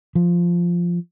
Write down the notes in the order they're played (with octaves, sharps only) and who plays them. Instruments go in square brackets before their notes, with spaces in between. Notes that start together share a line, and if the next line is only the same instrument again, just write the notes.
[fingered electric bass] F3